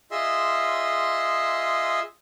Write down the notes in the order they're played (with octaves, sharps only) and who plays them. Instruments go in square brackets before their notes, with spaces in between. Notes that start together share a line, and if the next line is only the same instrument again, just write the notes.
[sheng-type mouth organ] F4 G#4 D#5 E5 C6